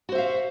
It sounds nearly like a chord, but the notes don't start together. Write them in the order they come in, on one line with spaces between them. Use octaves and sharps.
F#4 C5 E5 F5